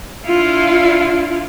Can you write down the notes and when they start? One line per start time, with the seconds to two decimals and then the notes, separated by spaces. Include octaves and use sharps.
0.24 D4 E4 F4